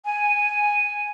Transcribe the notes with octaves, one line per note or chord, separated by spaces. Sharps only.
G#5